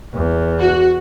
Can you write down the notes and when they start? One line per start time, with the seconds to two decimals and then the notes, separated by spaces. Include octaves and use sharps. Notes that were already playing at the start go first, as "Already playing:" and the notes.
0.15 E2
0.60 F#4